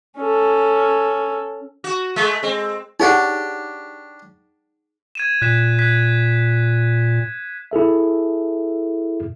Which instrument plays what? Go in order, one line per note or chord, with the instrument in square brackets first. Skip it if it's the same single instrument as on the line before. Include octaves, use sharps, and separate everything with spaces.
[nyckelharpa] C#4 A4
[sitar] F#4
G#3 A3
[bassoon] G#3 [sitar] C4
[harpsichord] D4 G4 C#5 [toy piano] D#4 G#4 F#5
[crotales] G#6 D#7 E7
[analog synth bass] A#2 [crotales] F#6 B6 E7
[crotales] F#6 G#6 B6
[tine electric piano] E4 G#4 A4 E5